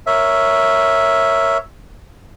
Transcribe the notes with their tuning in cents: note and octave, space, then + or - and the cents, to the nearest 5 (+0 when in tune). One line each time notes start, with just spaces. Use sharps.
A#4 +0 C#5 +0 E5 +0